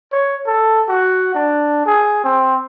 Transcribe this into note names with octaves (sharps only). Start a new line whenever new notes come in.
C#5
A4
F#4
D4
G#4
C4